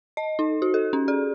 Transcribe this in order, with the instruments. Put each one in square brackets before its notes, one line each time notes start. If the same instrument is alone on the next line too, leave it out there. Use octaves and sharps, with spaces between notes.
[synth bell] D#5
D#4
F#4
A4
C#4
G#4